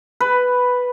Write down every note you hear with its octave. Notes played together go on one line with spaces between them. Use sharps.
B4